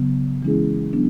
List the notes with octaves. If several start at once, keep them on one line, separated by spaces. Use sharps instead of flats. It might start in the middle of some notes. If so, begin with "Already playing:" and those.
Already playing: C#3 F#3 B3
E3 G#3 C#4 E4 G#4
F#3 B3 D4